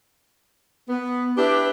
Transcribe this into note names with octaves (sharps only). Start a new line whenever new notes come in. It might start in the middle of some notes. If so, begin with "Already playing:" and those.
B3
D4 E4 G4 B4